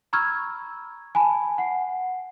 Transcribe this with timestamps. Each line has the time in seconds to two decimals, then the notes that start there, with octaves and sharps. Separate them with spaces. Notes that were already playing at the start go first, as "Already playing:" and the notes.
0.13 A#5 B5 C#6 E6 F6 G#6
1.15 G#5 A5 B5
1.58 F#5 C7